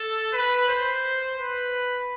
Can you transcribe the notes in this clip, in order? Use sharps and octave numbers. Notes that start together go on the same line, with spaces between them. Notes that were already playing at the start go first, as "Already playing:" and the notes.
Already playing: A4
B4
C5
B4